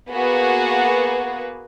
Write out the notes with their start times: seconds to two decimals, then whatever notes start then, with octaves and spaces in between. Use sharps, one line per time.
0.11 A#3 B3 F#4 G#4 B4